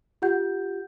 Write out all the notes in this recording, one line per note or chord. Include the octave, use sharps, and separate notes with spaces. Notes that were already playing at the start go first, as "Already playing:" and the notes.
F4 G4 F#5 G6